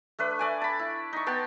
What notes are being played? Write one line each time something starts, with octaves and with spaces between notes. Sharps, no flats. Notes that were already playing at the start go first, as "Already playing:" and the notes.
A3 D4 B4
A3 D5 G#5
A5 B5
E4
D#4 C#6
B3 G5 A5 C6